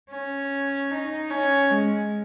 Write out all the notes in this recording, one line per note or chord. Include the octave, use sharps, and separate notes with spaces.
C#4
D#4
C#4
G#3